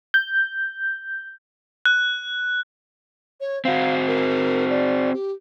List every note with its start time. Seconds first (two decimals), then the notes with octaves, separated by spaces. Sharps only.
0.14 G6
1.86 F#6
3.40 C#5
3.65 C4 F#4 F5
4.07 A#4
4.69 D5
5.13 G4